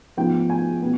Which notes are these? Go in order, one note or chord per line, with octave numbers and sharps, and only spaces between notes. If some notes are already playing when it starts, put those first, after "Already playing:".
G#2 F3 B3 G5
G#5
B2 B3